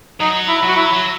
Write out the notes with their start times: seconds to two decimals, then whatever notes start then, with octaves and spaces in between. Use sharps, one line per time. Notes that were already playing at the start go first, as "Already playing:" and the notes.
0.20 F#3 D#4
0.48 E4
0.63 F#3
0.68 F#4
0.76 E4
0.93 F#3